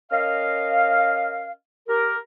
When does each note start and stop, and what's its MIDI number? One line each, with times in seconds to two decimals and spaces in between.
0.11 1.52 61
0.11 1.52 70
0.11 1.52 75
0.11 1.52 77
1.88 2.16 67
1.88 2.16 70